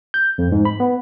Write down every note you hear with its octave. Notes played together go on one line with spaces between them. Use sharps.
G6
F2
G#2
B5
B3